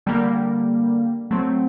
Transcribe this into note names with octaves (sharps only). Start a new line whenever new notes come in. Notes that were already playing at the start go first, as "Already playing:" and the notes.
D3 G3 A#3
F#3 A3 C4